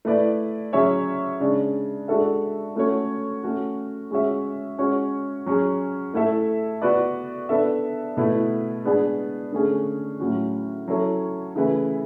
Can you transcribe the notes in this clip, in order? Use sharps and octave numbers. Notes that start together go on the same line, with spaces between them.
A3 E4 B4 D5
F#3 C#4 G#4 C#5 E5
C#3 G#3 D4
G#3 D4 F#4 A4 E5
A3 C#4 F#4 A4 C#5
A3 C#4 F#4
G#3 C#4 F#4 C#5 E5
G#3 C#4 F#4 C#5
F#3 C#4 G#4
A3 E4 A4 E5
B3 F#4 B4 D5
B3 D4 A4 E5
B2 A3 E4 B4
G#3 B3 D4 G#4 B4
D3 A3 C#4 G#4
A2 F#3 C#4 F#4
F#3 C#4 E4 A4 C#5
C#3 E3 A3 E4 B4